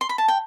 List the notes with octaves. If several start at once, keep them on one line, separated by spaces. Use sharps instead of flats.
C6
B5
A5
G5